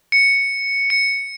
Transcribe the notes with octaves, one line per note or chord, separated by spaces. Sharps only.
C#7
C#7